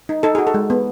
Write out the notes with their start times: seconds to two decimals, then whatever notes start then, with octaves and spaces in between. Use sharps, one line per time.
0.09 D#4
0.23 D#4 A4
0.35 F#4 G#4
0.47 A4
0.54 G#3
0.70 B3